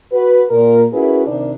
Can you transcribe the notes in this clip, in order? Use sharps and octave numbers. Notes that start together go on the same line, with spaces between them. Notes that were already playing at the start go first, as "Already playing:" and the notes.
F#4 B4
A#2 A#4
C#4 E4 F#4 G#4 A#4 B4
C3 D#3 D4